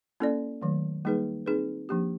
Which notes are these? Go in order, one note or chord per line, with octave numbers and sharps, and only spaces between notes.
A#3 C#4 E4 A4 D5
D#3 F#3 A3
G3 A#3 D#4 G#4 B4
C4 D#4 G#4 B4
F3 A#3 D4 G4